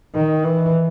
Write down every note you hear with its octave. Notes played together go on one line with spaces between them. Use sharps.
D#3
E3